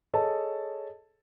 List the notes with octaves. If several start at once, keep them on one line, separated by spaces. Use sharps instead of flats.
G#4 A4 C#5 D#5 A5